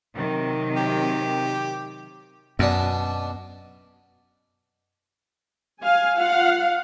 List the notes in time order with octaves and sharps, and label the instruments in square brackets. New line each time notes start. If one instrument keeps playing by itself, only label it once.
[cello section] C3 D#3 F#3
[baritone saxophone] G4
[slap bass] F#2 [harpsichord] B2 B3 D4
[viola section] F5 G#5
F4 F5 F#5